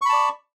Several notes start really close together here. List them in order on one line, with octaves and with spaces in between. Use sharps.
C#6 B5 A5 D5